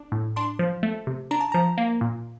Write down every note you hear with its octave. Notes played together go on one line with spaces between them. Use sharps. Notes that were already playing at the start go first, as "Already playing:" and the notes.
Already playing: D4
A2
D4 C6
F3
A3
C3
D4 A#5
A5
F3 A#5
A#3
A#2